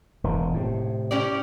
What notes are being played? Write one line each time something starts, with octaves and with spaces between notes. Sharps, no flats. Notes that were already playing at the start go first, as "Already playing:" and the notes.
E1 D#3
A2 C3
C#4 G4 D5